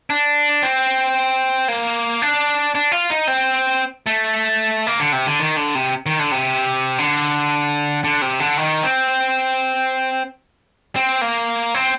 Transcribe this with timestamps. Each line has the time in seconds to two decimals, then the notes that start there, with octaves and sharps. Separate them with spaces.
0.10 D4
0.63 C4
1.68 A#3
2.22 D4
2.75 D4
2.92 F4
3.10 D#4
3.28 C4
4.06 A3
4.87 A#3
5.00 D3
5.13 C3
5.27 D3
5.39 D#3
5.57 D3
5.75 C3
6.06 D#3
6.19 D3
6.32 C3
6.98 D3
8.04 D3
8.22 C3
8.40 D3
8.58 D#3
8.83 C4
10.96 C4
11.21 A#3
11.74 C4